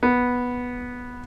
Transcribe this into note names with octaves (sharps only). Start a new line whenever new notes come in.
B3